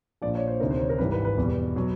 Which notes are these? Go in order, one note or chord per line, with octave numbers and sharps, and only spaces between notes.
A#1 A#2 F3 D5
C#5
C5
D2 C3 D#3 A#4
C5
C#5
A#4
G#1 G#2 E3 G3 B4
B4
B4
E2 B2 G3
B2 F#3